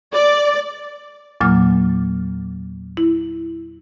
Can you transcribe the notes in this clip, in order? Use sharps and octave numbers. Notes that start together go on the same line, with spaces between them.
D5
E2 A#2 F#3 A#3 D6 F6
E4